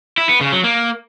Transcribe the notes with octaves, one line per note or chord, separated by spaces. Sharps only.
E4
B3
C#3
F#3
A#3